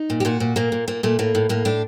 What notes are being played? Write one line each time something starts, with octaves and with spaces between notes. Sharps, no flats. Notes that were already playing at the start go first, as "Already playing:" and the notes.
Already playing: D#4
A#2
G4
A#2 F#4
A#2
A#2 A#3
A#2
A#2 A#3
A#2 A3
A2 A#3
A2
A2 A#3
A2 D4